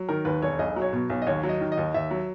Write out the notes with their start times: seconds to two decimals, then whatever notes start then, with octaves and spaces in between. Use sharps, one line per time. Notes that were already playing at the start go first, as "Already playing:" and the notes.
Already playing: F#3
0.09 D#3 A#4
0.25 D#2 B4
0.42 E1 C#5
0.59 B1 D#5
0.76 F#3
0.82 C#5
0.93 B2
1.10 B1
1.22 D#5
1.27 D#2 C#5
1.43 F#3
1.49 D#5
1.61 D#3
1.72 D#5
1.78 D#2
1.94 D#2 E5
2.11 F#3